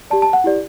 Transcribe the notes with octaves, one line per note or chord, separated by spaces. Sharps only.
G4 D5 A5
A5
F#5
E4 G4 D5